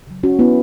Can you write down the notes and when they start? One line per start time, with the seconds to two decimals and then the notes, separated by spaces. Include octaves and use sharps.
0.07 C#3 F#3
0.23 C#4 F#4
0.39 B3 E4